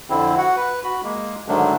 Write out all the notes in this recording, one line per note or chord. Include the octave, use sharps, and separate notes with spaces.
F2 D3 C4 E4
F#4 F#5
B4
F#4 B5
G#3 A#3
G#2 D3 D#3 F#3 A3 D4